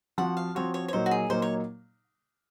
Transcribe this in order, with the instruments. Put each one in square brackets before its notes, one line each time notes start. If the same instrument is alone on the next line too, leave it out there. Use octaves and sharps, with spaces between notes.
[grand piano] F3 C4 F#4 [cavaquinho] F#5
[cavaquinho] F5
[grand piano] F3 C4 F#4 [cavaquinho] C#5
[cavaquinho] C#5
C#5
[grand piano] A#2 F#3 A#3 D#4 [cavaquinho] C5
[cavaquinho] F#4
G#4
[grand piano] A#2 F#3 A#3 D#4 [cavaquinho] C5
[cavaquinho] C#5